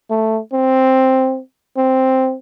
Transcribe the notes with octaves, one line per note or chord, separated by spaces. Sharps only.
A3
C4
C4